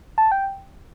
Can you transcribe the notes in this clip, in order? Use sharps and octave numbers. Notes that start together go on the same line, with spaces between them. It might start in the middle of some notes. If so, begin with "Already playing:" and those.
A5
G5